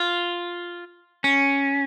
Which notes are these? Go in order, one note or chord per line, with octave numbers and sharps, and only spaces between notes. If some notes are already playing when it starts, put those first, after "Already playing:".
Already playing: F4
C#4